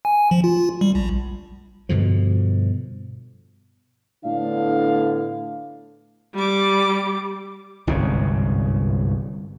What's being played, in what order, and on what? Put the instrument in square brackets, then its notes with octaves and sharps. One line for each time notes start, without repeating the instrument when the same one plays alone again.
[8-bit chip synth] G#5
F3
F4
G3
A#1
[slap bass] G2 B2 D3 F3
[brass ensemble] A2 D3 B3 D4 F5
[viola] G3 D6
[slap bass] G1 C2 G#2 C#3